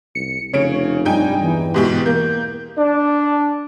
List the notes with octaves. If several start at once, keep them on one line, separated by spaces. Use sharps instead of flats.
C2 C#7
F1 C#3 C#5 D7
G2 G3 D#4 G5 G#5
E2 E3
G#2 B2 G4
A#3 G6
D4